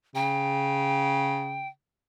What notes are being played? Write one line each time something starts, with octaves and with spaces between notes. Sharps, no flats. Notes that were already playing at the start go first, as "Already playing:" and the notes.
C#3 G5